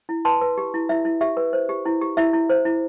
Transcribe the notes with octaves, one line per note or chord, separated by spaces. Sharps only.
E4
B4 A5 C6
B4
G4
E4
E4 E5
E4
G4 E5
B4
C5
G4
E4
G4
E4 E5
E4
C5
E4